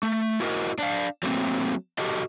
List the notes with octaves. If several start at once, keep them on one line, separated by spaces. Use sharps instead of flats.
A3
E4 F#4 A#4 D#5
D4 D5 F5
F#3 A3 A#3 C4
F#4 G4 A4 D#5